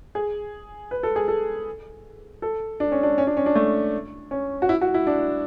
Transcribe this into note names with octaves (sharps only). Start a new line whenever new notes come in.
G#4
B4
A4
G#4
A4
A4
D4
C#4
D4
C#4
D4
C#4
D4
A3
C#4
F#4
E4
F#4
E4
D4